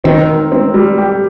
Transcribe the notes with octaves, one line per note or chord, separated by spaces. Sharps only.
D#3 C4
A#4
C4
G3
G4